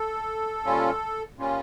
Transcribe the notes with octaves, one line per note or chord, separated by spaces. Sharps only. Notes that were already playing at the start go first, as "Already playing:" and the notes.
Already playing: A4
A#2 G3 C#4 F4
A#2 G3 C#4 F4